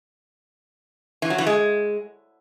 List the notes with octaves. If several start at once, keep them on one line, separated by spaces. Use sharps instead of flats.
E3
F#3
E3
G#3